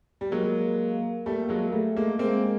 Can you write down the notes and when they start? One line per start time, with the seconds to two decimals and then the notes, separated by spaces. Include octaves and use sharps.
0.21 G3
0.31 F#3 G#3 A#3
1.26 G3 A3 A#3
1.49 F#3 G#3
1.72 G3 A3
1.97 G#3 A#3
2.19 G#3 A#3 C4